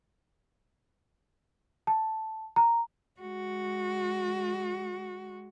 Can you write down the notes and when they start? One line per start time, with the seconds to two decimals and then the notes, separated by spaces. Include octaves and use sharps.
1.87 A5
2.56 A#5
3.21 G#3 F#4